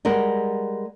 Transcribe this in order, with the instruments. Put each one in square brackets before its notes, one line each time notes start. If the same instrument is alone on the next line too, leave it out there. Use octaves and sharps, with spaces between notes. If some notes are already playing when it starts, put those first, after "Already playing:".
[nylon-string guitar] G3 G#3 A#4 F#5